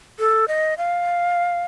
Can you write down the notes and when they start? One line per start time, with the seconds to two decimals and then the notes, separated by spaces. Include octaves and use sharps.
0.19 A4
0.48 D#5
0.78 F5